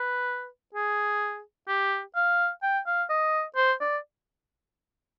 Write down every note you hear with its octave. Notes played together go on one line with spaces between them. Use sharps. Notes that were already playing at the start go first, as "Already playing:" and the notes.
Already playing: B4
G#4
G4
F5
G5
F5
D#5
C5
D5